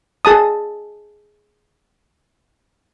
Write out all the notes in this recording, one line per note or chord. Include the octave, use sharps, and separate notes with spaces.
G#4 A5 D#6